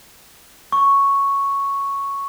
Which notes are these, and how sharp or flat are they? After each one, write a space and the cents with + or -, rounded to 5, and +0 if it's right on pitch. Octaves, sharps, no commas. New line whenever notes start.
C#6 +0